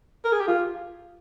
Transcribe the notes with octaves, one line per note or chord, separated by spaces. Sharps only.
A#4
G#4
G4
F4